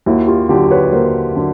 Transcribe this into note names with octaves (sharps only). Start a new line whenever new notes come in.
D#2 E4 F#4
F4 G4
D3 F#3 F4 G4
B4 C#5
D#2 A#4 C5
D3 F#3